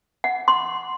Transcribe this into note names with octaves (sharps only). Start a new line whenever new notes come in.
F#5
C6